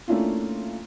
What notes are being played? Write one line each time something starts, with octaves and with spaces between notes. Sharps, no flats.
A3 A#3 C#4 D4 E4 F4